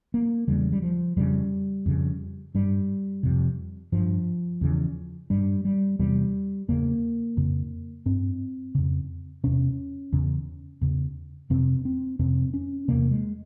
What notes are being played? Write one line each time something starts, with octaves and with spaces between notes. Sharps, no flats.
A#3
E2 C#3 G3
G3
F3
F2 C#3 G3
F2 C#3
G2 G3
F2 C3
G2 F3
E2 C#3
G2 G3
G3
E2 C3 G3
E2 C#3 A#3
F2 C#3
G2 C4
F2 C#3
E2 C3 C#4
E2 C#3
E2 C#3
F2 C3 C4
C4
F2 C3 C4
C#4
E2 C3 A#3
G#3